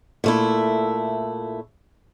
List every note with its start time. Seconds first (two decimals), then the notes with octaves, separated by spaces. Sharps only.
0.24 A#2 A3 E4